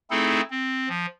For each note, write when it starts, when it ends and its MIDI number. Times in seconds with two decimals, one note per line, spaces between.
0.11 0.41 57
0.11 0.41 60
0.11 0.41 63
0.11 0.41 64
0.11 0.41 68
0.11 0.41 69
0.51 0.89 60
0.89 1.06 53